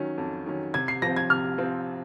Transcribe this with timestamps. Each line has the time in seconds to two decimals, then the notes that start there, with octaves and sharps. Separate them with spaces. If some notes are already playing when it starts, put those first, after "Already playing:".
Already playing: D#3 F#3 C#4
0.18 F2
0.46 D#3 F#3 C#4
0.74 C3 G#6
0.88 C7
1.02 F3 C4 A#6
1.16 G#6
1.30 C3 F6
1.58 F3 C4